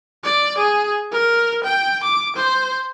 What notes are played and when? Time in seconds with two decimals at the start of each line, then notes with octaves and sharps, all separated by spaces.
0.24 D5
0.58 G#4
1.12 A#4
1.64 G5
2.03 D6
2.36 C5